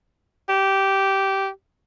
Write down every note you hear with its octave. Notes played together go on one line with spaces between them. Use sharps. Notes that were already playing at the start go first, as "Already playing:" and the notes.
G4